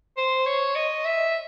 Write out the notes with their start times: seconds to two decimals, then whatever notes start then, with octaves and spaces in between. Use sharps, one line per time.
0.17 C5
0.46 C#5
0.75 D#5
1.05 E5